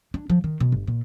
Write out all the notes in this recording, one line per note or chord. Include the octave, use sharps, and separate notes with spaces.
D4
F3
D#3
B2
G1
A#2